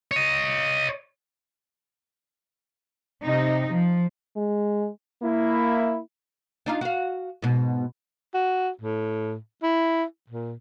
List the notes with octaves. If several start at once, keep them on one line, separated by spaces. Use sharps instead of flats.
C#5 D#5
C3 D#4
F3
G#3
A#3 E4
D4 D#4 F4
F#4 F5
G#2 B2
F#4
A2
E4
A#2